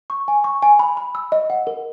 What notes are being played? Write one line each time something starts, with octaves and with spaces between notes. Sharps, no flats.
C#6
G#5
C#6
G#5
B5
B5
E6
D#5
F#5
A#4